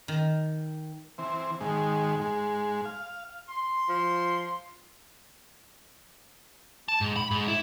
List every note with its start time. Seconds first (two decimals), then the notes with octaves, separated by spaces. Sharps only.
0.08 D#3
1.18 E3 C4
1.61 G#2 D#3 G#3
2.20 G#2 G#3
2.85 F5
3.49 C6
3.89 F3
6.88 A5
7.01 G#2
7.16 B5
7.31 G#2
7.48 E4